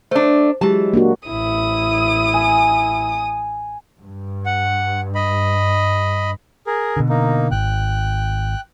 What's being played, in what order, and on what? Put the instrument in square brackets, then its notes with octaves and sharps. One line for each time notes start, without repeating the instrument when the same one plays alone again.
[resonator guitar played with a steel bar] A3 D4 [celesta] C5
[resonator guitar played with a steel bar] E3 A5 [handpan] F#3 G#3 [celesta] G4
[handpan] A#3 D4 F#4
[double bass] A1 E4 [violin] D#6
[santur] G#5
[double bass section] G2
[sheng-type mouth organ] F#5
D#5 B5
G#4 A#4
[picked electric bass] B2 D3
[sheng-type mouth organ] A#3 D#4
[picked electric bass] G#1 [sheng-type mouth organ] G5 F#6